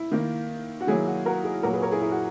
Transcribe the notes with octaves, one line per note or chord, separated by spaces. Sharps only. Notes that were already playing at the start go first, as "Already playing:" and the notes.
Already playing: E4
D#3 A#3
F#4
D#3 F#3 A#3 E4 G#4
F#4
F#4 A#4
E4 G#4
A#2 F#3 A#3 F#4 A#4
G#4 B4
A#4 C#5
E4 G#4
E4 G#4
F#4